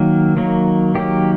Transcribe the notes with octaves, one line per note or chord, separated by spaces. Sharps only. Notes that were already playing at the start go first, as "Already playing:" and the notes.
Already playing: D#3 F#3 A#3
D#3 F#3 A#3
D#3 F#3 A#3 G4